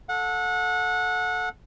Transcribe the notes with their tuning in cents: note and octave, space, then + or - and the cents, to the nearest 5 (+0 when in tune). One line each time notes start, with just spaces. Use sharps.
A4 -10 F#5 -25